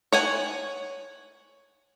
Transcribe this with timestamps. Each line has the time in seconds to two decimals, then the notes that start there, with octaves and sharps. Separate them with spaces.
0.12 C#5 F#5 G#5